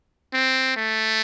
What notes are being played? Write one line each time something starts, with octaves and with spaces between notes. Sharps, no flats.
C4
A3